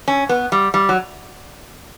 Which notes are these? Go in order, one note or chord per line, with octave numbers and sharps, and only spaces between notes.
C#4
B3
G3
G3
F#3